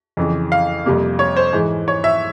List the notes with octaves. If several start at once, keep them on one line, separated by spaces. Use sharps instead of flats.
F2 C#3 E3
F5
F2 C3 G3 A#3
C#5
C5
G#2 E3 G#3
C#5
E5